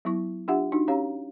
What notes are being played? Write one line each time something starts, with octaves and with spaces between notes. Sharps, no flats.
F#3 B3 E4 C#6
D4 F4 G4 E5 F#5
D4 D#4 F#4
C#4 G4 C#5 F5 A#5